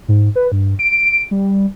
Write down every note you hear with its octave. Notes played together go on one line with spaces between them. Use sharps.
G#2
B4
G2
D7
G3